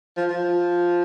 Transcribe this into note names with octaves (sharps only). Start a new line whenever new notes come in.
F3
F3